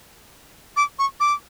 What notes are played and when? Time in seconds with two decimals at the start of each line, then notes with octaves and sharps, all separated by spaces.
0.77 D6
0.99 C#6
1.20 D6